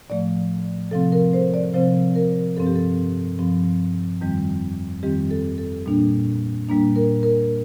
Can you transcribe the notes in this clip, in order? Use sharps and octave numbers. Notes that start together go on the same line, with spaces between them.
A2 F3 A3 D5
C3 F3 C4 A4
A#4
C5
D5
C3 F3 C4 C5
A#4
G2 F3 C4 A4
G4
A4
G2 F3 C4
F2 D#3 G3 C4
F2 D#3 G3 C4 G4
A4
A4
A#2 G3 A#3 D4
A#2 G3 A#3 D4
A#4
A#4